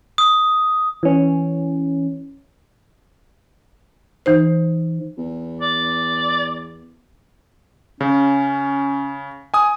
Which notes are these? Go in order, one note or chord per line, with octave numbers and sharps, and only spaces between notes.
D#6
E3 C#4
E3 D#4 C5
E2
D5
C#3 C#4
G#5 D#6